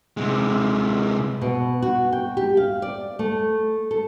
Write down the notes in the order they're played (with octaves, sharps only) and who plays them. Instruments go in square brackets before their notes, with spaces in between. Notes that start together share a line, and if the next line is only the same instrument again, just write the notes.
[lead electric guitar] C3 G#3
[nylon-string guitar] B2
F#4
G5
G4
F5
D5
A3
A4